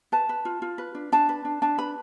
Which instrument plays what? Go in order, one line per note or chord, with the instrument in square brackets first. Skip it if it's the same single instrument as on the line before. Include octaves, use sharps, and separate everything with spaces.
[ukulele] B4 A5
B4
F4
F4
B4
D4
D4 A5
B4
D4
D4 A5
B4 B5